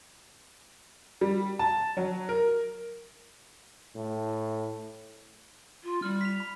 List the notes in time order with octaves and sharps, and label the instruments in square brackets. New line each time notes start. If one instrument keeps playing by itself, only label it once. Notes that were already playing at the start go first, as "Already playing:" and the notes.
[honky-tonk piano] G3
A5
F#3
A#4
[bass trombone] A2
[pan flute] F4
[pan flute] G3 [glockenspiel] F6
[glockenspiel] B6 F7
B5